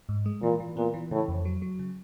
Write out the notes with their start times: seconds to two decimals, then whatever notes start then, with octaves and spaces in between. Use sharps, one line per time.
0.09 G#2
0.26 G#3
0.43 A#2 E3
0.60 E3
0.77 A#2 B3
0.94 E3
1.11 A2 C#3
1.28 F2
1.45 F#3
1.62 F#3
1.79 C#3